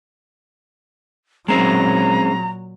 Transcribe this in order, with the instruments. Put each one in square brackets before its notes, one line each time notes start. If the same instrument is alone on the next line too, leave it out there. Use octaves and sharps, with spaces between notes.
[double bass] A#2 F#3 [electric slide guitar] G#3 C4 C#4 [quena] A#5